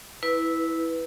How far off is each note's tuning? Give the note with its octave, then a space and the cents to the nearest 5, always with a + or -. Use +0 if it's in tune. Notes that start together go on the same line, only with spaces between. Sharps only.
E4 -10 B4 +0